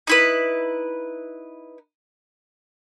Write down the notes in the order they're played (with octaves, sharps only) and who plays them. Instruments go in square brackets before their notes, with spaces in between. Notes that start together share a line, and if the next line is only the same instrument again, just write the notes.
[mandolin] D#4 E4 B4